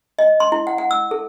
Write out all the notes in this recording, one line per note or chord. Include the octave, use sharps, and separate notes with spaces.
D#5
C6
E4
F#5
F#5
E6
A4